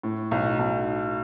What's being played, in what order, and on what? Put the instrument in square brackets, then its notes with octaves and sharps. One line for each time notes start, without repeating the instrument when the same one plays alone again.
[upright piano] A2
B1
B1